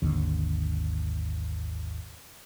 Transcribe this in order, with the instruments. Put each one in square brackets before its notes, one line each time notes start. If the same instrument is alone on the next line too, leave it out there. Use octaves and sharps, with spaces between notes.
[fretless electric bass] G#1 D#2 D3